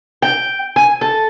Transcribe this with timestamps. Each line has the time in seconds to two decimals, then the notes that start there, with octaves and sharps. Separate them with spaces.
0.22 G5
0.76 G#5
1.01 A4